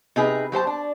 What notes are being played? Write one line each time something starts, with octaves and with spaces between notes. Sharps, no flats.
C3 D#4 G#4 B4
F#3 G4 C5 A5
D4